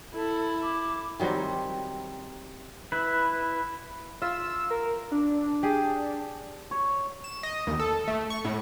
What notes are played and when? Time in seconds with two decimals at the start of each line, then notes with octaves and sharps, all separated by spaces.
0.14 E4 A4
0.63 D6
1.20 D#3 F#3 G3 C4
2.92 E4 B4
4.22 F4 E5 E6
4.70 A#4
5.12 D4
5.63 G4 G#4
6.71 C#5
7.24 E7
7.43 D#5
7.67 D#2
7.79 A4
8.08 A3
8.30 C#6
8.45 A2